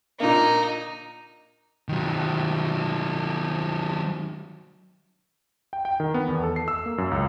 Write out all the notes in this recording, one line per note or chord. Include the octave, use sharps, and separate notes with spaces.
A#2 D3 A#3 D#4
D#3 F#3
G5
G5
D#3
B3
E2
A4
C7
E6
A#3
F#2
C#2